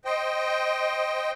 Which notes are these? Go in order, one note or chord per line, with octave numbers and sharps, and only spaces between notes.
C5 D#5 G5